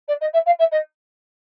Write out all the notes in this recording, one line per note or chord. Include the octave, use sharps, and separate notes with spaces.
D5
D#5
E5
F5
E5
D#5